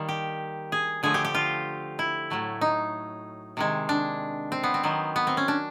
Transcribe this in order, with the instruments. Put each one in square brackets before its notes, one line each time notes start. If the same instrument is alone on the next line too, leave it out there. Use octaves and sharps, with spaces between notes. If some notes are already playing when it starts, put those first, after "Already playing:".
Already playing: [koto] D#3 G3 A#3
G4
G#4
D3 F3 A3 G#4
G4
G4
F4
E4
A2 F#3 A3
D#4
C3 D#3 G#3
D4
C4
B3
C4
D#3 F#3 B3
B3
C4
C#4
D4